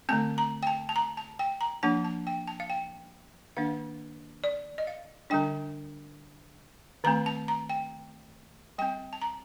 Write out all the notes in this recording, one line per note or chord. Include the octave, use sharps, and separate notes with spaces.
D3 A3 C4 A5
A#5
G5
A5
A5
A#5
A5
G5
A#5
F3 A#3 D4 A5
A5
G5
A5
F5
G5
D#3 A#3 D4 F5
D5
D#5
F5
D3 G3 D4 G5
D#3 A3 C4 A#5
A5
A#5
G5
G3 C4 G5
A5
A#5